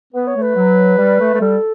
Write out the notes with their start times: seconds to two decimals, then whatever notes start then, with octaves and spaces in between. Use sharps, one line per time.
0.14 B3 B4
0.28 C#5
0.35 A3
0.42 B4
0.56 F#3
0.98 G3
1.20 A3
1.35 A3
1.41 G3 A4